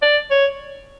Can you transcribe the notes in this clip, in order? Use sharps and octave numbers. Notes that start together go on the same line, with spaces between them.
D5
C#5